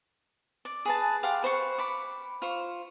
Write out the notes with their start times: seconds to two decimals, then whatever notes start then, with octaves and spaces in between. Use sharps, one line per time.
0.65 D5
0.85 G#4 B4 A5
1.23 G4 F5 F#5 C6
1.43 B4 C5 A#5 C#6
1.78 B5 D6
2.42 F4 C5 C#6